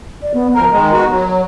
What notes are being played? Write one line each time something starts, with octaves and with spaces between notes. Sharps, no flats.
D5
B3
D2 F3 A#4 A#5
D#3 G#3
B2 F#4
F#3